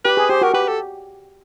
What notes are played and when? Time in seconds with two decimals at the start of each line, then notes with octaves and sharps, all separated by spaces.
0.04 G4 B4
0.17 G#4
0.29 G4 C5
0.41 F#4 A#4
0.54 G4 B4
0.68 A4